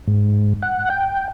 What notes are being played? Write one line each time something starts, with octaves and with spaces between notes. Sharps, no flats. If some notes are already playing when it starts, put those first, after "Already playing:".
G#2
F#5
G5